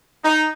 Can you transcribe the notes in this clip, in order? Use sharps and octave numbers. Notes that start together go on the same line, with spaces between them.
D#4